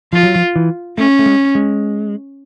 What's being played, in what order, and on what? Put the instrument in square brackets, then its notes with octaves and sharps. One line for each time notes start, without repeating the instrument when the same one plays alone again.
[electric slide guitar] F3 [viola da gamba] F4
[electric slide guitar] F#3
F3
E3
[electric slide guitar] A3 [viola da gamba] C#4
[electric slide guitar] A3
G#3
G#3